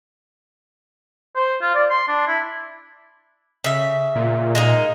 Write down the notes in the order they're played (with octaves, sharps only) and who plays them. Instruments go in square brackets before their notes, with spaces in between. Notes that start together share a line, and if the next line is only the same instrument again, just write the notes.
[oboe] C5
F4
D5
C6
D4
E4
[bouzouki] C#3 E5
[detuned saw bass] A#2
[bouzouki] G#3 A#3 D#4